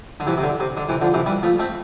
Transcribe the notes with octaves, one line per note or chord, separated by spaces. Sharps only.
D3
C3 E3
C3
D3
C3
D3
C3 E3
D3 F3
C3 E3
E3 G3
F3 A3
A3 C4